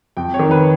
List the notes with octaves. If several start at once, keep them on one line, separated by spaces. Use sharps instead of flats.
F2 G5
C#5
D#3
B4